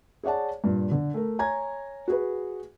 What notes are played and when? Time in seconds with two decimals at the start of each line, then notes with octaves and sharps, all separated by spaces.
0.23 G#4 C#5 D5 F#5 A5
0.64 G2 A#2
0.91 D3
1.14 A3 A#4
1.39 C#5 G#5 A#5 G#6
2.08 F#4 G#4 B4